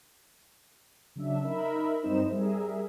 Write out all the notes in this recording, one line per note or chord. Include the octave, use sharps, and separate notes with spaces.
C#3 F#3 D4 E5
D#4 A#4 E5 B5
G2 F#3 C4 D#4 C5 E7
G3 G#4 A#4 E5